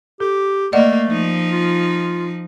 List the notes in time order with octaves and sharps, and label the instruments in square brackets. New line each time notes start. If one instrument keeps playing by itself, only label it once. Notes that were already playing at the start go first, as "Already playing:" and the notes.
[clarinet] G4 [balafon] A4
[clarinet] A3 [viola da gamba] A#3 [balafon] D5 D#5 F#5
[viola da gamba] F3 D#4
[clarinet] F4